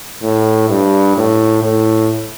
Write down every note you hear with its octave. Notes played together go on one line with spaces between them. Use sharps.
A2
G2
A2
A2